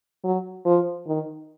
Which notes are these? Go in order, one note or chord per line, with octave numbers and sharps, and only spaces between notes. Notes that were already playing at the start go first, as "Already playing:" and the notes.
F#3
F3
D#3